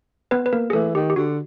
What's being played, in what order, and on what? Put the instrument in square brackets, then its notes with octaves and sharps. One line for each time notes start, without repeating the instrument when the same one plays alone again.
[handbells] B3 B4
B4
A#3 A#4
G#4
[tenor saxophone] E3 [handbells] A3 A4
[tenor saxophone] D#3 [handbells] G4
[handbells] G4
[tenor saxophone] D3 [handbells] F#4